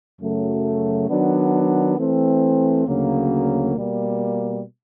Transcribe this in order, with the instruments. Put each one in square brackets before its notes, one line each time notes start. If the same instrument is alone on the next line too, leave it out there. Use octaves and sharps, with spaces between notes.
[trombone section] F#2 C#3 F#3 A3
D#3 F#3 B3 D4
E3 A3 C4
D2 C#3 F#3 A#3
B2 G3 A#3